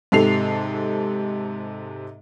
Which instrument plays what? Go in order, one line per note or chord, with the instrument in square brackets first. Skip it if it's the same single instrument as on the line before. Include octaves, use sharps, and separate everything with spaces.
[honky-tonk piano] G#2 C3 A4 C7 F7